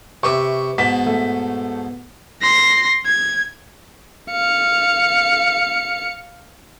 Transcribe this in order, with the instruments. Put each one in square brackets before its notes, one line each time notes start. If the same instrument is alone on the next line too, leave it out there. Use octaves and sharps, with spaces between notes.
[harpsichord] C3 B4 E5 [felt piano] C#6 D6
[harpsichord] G#2 B2 A5 [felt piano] B6
[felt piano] A3
[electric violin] C6 A#6
G#6
F5 C#7